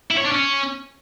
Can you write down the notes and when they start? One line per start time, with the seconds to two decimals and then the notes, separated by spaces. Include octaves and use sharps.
0.10 E4
0.17 C#5
0.24 D4
0.31 C#4